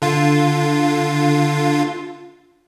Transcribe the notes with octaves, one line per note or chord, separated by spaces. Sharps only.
D3 F4